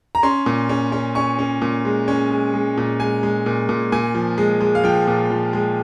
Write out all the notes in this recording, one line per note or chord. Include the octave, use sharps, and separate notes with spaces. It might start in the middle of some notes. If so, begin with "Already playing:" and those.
A#5
C#4 C6
A#2
C#4
C#4
C#4 C#6
C#4
A#2
G#3
C#4
G#3
G#3
A#2
G#3 G#5
G#3
A#2
A#2
A#2 G#5
F3
G#3
G#3
F5
F3 G5
A#2
F3
G#3